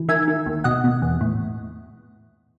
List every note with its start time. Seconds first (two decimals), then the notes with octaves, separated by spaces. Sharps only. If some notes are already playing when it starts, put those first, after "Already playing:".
Already playing: E3
0.08 D#3 E5 G#5
0.28 D#3
0.46 D#2
0.64 B2 D#5 F#5
0.84 B2
1.02 E2
1.21 A2